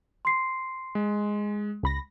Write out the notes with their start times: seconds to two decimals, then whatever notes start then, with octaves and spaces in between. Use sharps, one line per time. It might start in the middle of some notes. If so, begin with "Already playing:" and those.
0.25 C6 C7
0.95 G#3
1.83 C#2 B5 A#6